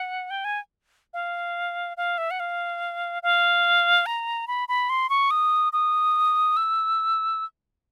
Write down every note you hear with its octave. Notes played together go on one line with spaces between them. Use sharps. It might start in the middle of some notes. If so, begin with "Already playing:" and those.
Already playing: F#5
G5
G#5
F5
F5
E5
F#5
F5
F5
A#5
B5
B5
C6
C#6
D#6
D#6
E6